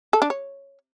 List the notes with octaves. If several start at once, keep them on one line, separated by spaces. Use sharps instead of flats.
A4
D4
C#5